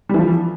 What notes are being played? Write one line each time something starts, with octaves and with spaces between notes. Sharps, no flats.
E3 F3 G3